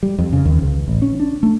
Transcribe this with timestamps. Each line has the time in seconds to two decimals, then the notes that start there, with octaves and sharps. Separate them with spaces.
0.03 G3
0.18 F2
0.33 C#3
0.45 D#2
0.62 C#2
0.88 A1
1.02 C#4
1.20 D4
1.43 A3